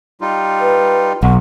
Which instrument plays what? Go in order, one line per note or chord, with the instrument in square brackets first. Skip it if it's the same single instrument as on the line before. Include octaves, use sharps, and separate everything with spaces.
[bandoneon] G3 D#4 F4
[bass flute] B4
[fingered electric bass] B1 [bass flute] F#5